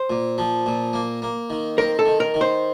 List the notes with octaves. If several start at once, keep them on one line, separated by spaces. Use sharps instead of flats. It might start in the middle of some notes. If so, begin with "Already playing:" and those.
Already playing: C5
A#2
F3
A#2
A#3
A#3
D#3
C4 A#4
A4
D#3
A#4
D#3
C5